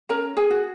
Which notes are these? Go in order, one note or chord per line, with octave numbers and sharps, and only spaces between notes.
C#4 A#4 A#5
G#4 G#5
F#4